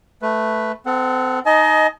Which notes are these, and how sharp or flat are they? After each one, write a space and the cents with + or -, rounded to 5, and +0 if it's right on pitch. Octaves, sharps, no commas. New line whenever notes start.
A3 +0 B4 +0
C4 -30 A4 +0 F#5 +0
D#4 +0 D#5 +10 G#5 +45